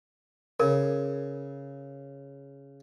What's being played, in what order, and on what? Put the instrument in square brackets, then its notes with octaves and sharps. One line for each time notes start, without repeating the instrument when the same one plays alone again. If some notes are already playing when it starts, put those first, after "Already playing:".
[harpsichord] C#3 [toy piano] A#4